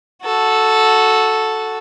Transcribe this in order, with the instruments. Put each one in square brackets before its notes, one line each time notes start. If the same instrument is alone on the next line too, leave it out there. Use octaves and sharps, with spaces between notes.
[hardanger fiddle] F#4 A4